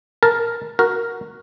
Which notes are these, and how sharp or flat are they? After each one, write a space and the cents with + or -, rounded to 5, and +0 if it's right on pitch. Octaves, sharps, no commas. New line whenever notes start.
A#4 +0 A5 +0
F#4 +0 A#4 +0